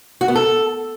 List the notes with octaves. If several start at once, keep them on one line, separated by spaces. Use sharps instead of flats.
F#4
B3
A4